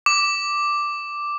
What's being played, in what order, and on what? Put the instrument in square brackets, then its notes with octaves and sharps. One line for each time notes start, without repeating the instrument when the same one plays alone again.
[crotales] D6